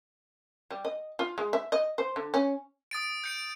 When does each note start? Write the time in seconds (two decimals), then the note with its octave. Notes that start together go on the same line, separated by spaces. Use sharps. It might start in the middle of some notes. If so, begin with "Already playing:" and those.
0.71 G3
0.85 D#5
1.19 F4
1.38 G#3
1.53 E5
1.72 D#5
1.98 C5
2.16 D3
2.34 C#4
2.91 D#6 A6 D7
3.24 G6 C#7 D7